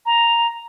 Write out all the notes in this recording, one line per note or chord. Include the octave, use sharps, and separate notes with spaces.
A#5